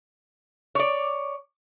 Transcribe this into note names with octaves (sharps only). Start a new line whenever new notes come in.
C#5 D5